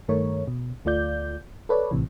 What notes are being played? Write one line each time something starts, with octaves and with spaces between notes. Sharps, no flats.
G2 D#3 A3 A#4 C#5
B2
D2 A3 F4 D5 G6
A4 B4 C#5 D5
A#1 A2 C3 E3